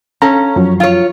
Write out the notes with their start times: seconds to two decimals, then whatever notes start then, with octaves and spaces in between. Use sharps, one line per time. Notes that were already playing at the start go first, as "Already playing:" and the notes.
0.22 C#4 A4 F5 A#5
0.56 F#2 F3 F#3
0.80 F4 C#5